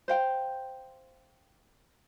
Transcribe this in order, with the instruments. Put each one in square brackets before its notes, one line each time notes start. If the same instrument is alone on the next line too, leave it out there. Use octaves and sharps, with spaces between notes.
[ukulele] C5 F5 G5